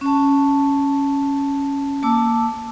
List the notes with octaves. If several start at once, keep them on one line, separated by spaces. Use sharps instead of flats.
C#4 A5
A#3 A5 D6 E6